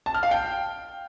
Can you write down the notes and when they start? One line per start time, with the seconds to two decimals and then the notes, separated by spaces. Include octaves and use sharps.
0.06 A5
0.15 F6
0.23 F5
0.31 G5